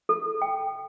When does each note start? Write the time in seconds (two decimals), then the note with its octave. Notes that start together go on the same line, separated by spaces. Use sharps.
0.09 A4
0.42 G5